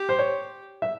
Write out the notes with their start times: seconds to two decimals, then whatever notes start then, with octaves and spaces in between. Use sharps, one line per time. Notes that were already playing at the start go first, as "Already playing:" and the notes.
Already playing: G4
0.09 C5
0.19 C#5
0.82 E5